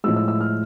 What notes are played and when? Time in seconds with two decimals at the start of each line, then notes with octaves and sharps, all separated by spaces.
0.04 A2 F3 G#3 E6
0.16 E6
0.28 E6
0.41 F6